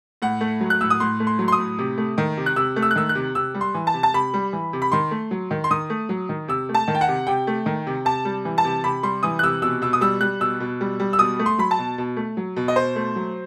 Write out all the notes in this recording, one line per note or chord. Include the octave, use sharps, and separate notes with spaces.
A2 F#5
A3
F#3
F#6
A2 E6
D#6
A2 C6
A3
C6
F#3
C6
D#6
A2
C3
A3
D#3
C3
F#6
C3 E6
A3
E6
F#6
D#3 E6
F#6
C3
C3 E6
G3
C6
E3
A5
C3
A5
C3 B5
G3
E3
C3
B5
D#3 C6
A3
F#3
D#3
C6
D#3 D#6
A3
F#3
D#3
C3 E6
A3
A5
D#3
G5
F#5
C3
C3 G5
A3
D#3
C3
C3 A5
G3
E3
A5
C3
C3 B5
G3 C6
E3 D#6
F#6
C3 E6
B2 E6
B2 E6
D#6
G3 E6
G3 F#6
B2 E6
B2
G3
G3
E6
B2 D#6
A3
C6
F#3 B5
A5
B2
B2
A3
F#3
B2
D#5
B2 C5
A3
F#3